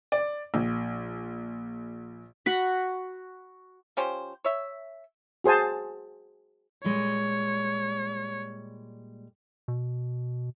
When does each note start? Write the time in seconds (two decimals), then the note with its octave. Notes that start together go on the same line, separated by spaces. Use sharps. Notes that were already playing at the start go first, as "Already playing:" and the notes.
0.12 D5
0.54 A#1
2.46 F#4 B5
3.97 F3 C#4 G4 C5
4.44 C#5 E5
5.44 F#4 G#4 C5 G#5 A5
6.84 A#2 G3 G#3 C#5
9.68 B2